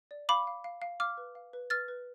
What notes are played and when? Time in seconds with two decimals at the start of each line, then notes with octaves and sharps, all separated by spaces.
0.11 D5
0.29 F5 B5 D6
0.47 F5
0.64 F5
0.82 F5
1.00 F5 D6 F6
1.17 B4
1.35 F5
1.53 B4
1.70 B4 F6 A6
1.88 B4